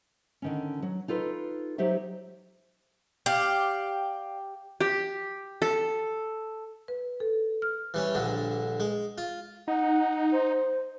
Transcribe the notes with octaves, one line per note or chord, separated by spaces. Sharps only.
D3 D#3 C#4
F#3
D#4 F4 A4 B4
F#3 D#4 G4 C5 E5
G4 D5 F5
G4
A4
B4
A4
F6
E3 G3 C#4
A#1 G2 D3
G#3
F4
D#4 F#5
C5